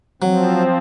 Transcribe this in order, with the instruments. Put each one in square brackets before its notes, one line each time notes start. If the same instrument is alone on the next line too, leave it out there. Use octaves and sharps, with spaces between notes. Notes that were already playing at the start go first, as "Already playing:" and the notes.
[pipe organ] F3 C4 [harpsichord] F#3